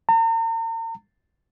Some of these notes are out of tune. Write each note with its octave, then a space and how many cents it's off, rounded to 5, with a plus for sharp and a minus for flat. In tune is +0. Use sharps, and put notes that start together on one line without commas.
A#5 -40